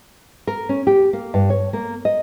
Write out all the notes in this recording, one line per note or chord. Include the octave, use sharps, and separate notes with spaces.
A#4
C#4
G4
A#3
G2
C#5
A#3
D#5